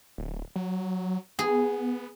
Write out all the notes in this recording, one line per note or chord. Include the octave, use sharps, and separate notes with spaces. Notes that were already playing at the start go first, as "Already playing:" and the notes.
D1
F#3
B3 G#4